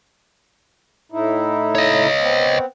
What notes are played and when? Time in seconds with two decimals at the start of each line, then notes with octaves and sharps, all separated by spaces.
1.12 A2 D#4 E4
1.75 C#5 D#5
2.20 B3 C4